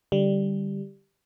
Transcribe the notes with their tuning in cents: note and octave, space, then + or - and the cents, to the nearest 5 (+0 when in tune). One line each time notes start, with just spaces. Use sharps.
D3 +0 G3 +0